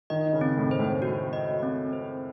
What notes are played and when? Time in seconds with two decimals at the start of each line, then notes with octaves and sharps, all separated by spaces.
0.10 D#3 D#5
0.33 C#3
0.41 C4
0.57 A2
0.71 C5
0.79 A2
1.02 F#4
1.33 D#5
1.63 C4
1.93 C5